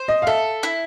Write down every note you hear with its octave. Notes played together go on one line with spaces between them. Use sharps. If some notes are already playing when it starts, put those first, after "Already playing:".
Already playing: C5
D#5
F5
A4 E5
E4